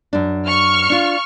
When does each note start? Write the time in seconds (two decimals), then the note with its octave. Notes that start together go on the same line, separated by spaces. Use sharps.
0.13 F#2 D4
0.46 C#6 F6
0.90 D4 F4